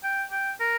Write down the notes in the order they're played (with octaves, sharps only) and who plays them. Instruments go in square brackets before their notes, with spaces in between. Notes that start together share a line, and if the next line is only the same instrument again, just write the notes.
[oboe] G5
G5
A#4